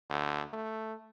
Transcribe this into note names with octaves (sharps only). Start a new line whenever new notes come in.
D2
A3